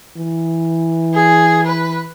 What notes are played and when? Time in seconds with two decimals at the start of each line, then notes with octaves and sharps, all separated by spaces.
0.17 E3
1.14 G#4
1.66 B4